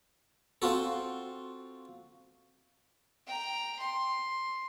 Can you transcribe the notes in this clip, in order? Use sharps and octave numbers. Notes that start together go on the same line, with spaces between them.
C4 F4 F#4 A4
G5 A#5
C6